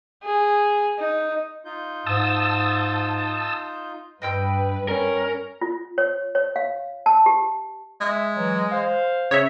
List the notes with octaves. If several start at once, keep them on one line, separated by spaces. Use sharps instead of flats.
G#4
D#4
D#4 F4 G6
G#2 A5 D#6 E6
G2 B4 D#5 G5 E6
C#4 A#4
F4
C#5
C#5
F5
A5
G4
G#3 E5
E3 F#3
C5 F5
C#3 C#5 E5